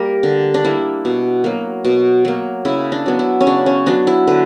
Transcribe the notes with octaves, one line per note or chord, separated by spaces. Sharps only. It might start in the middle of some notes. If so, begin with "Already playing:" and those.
Already playing: G3 A#3 G4 A#4
D3
D4
G3 A#3 E4
B2
F#3 A#3
B2
F#3 A#3
C#3 E4
D4
F#3 B3
E4
C#4
C#3 D4
C#4
F#3 B3 D4
E4
D3 B4